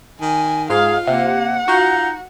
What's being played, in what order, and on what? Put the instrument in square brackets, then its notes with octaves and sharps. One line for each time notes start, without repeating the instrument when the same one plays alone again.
[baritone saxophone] D#3 [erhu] G#5
[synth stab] G#2 [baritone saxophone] F4 [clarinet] G#4 [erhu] F5
[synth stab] C3 [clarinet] A#3 [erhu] F#5
[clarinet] D#4 [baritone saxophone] F4 [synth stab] F#4